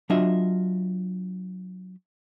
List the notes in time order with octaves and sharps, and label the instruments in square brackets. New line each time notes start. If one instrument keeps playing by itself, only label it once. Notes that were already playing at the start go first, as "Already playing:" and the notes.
[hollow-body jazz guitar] F#3 D4 F4 D#5 E5